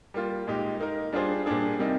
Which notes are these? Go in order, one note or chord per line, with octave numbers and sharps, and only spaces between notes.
G3 A#3 F4
A#2 G#3 D#4 G4
A#3 D#4 A#4
G3 D4 F4 G#4 C5
A#2 G3 D4 G#4
C3 G3 A#3 D#4